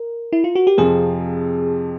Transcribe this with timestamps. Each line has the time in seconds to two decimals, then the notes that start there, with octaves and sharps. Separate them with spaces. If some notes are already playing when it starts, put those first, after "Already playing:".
Already playing: A#4
0.33 E4
0.44 F4
0.55 F#4
0.67 G4
0.77 F2 C3 F3 G#4